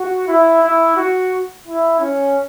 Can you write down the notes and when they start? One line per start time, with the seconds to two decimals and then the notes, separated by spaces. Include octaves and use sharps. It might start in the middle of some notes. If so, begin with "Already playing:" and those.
Already playing: F#4
0.28 E4
0.63 E4
0.97 F#4
1.66 E4
2.00 C#4